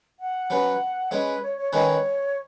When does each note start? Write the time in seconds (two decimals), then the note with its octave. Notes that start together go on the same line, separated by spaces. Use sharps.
0.20 F#5
0.50 F#3 C#4 B4
1.11 G#3 C#4 G#4 B4
1.42 C#5
1.58 C#5
1.72 D#3 G#3 C#4 G#4 B4 C#5